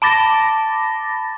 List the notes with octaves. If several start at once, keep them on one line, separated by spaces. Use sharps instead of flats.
A5 B5 D6 A6 A#6